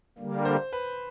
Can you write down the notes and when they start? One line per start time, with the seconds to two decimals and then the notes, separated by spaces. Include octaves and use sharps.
0.18 D3 G3 A#3
0.45 C5
0.73 B4